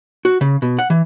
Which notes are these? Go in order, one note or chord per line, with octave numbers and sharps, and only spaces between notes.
F#4
C#3
B2
F#5
E3